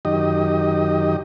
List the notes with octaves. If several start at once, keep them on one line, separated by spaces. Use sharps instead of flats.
F#2 D#3 G4 D#5